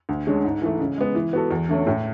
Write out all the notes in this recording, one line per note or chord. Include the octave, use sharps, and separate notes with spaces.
D2
D3 G#3 C#4 G#4
G#2
E3 A3
C#3
G#3 B3
E3
B3 F#4 A4
E2
D3 A3 C#4
A2